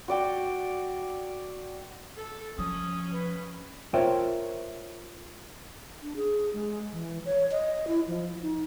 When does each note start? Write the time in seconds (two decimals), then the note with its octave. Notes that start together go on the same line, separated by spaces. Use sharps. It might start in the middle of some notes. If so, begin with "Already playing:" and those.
0.08 F#4 D5 G5
2.16 A4
2.58 F3 C#4 D#6
3.12 B4
3.94 F4 A#4 C5 C#5 E5 G5
6.03 D4
6.16 G#4
6.53 G#3
6.93 E3
7.25 C#5
7.51 D#5
7.87 E4
8.08 F3
8.42 D#4